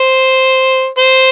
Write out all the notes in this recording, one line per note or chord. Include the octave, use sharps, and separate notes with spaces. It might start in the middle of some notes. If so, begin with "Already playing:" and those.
Already playing: C5
C5